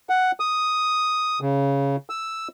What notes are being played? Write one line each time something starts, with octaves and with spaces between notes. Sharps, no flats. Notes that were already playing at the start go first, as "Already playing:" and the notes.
F#5
D#6
C#3
E6